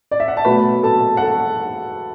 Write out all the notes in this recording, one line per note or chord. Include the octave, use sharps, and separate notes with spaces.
D5
E5
F#5
A5
B2 F#3 A3 B4 B5
A4 A5
F#5
A4 A5